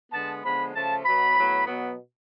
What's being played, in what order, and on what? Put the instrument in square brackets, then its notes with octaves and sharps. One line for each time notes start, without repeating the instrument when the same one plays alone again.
[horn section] D3 G#3 B3 A5
D3 F3 G#3 B3 B5
C#3 F3 A3 A5
B2 F#3 B3 B5
A2 F#3 B3
B2 F#3 B3